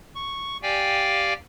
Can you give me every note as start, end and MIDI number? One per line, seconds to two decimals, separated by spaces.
0.15 0.57 85
0.62 1.33 67
0.62 1.33 74
0.62 1.33 77
0.62 1.33 79
0.62 1.33 80